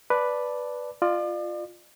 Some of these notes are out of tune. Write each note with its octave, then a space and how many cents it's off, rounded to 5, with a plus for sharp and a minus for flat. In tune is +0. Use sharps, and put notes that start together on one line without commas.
B4 +0 D5 +0 A5 +0
F4 +0 D5 +40